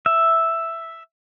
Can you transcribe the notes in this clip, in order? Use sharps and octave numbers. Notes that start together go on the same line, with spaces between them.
E5